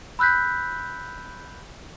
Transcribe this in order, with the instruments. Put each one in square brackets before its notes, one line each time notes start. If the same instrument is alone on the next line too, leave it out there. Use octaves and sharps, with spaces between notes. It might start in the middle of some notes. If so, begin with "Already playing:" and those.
[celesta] B5 E6 F#6 G6 B6